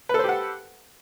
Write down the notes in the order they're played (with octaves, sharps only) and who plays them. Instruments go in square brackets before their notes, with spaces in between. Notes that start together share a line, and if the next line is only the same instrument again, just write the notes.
[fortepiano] B4
A4
C5
G4
F#5